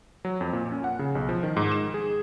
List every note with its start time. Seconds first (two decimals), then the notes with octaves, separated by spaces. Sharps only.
0.25 F#3
0.41 F2
0.53 A#2
0.72 C#4
0.84 F#5
0.99 C#3
1.15 B1
1.29 F3
1.43 D#3
1.57 G#2
1.72 E7
1.94 G#4